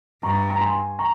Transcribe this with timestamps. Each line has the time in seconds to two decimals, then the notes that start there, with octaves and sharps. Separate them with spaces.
0.23 G2 A#5 C#6
0.50 A#5
0.61 G#5 C6
0.99 A#5 C#6